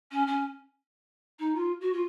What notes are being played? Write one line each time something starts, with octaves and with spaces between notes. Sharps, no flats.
C#4
C#4
D#4
F4
F#4
F4